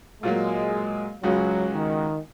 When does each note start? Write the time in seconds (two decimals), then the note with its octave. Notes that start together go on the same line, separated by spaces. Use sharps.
0.23 A#2 F#3 G#3 A#3
1.23 C#2 C#3 F#3 G#3 F#4
1.73 D#3